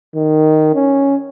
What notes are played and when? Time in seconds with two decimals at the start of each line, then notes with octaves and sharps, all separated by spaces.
0.15 D#3
0.75 C#4